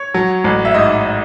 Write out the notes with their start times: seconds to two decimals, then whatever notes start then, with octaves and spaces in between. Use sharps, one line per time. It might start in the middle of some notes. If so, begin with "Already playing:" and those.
Already playing: C#5
0.14 F#3
0.44 A1
0.65 E5
0.74 G#2 D#5